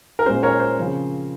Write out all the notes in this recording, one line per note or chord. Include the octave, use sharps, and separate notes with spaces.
A#4
A#2 G#3 C#4 C5
A#4 C#5
C5
C#3 F3 C4